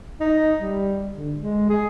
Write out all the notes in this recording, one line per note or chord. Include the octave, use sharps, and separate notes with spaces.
D#4
G3
D3
G#3
G#4